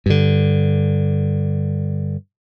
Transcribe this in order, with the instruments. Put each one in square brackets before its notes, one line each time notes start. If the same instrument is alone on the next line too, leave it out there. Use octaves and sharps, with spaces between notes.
[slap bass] G2 D3